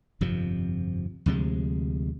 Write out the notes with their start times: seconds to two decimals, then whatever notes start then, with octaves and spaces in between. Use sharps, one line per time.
0.21 G1 F2 C3 F3
1.26 D2 C3 F3 G#3